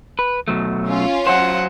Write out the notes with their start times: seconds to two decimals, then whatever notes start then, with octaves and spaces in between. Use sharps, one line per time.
0.19 B4
0.48 B2 F#3 A3
0.86 C#4 F4
1.27 F#3 C5 F#5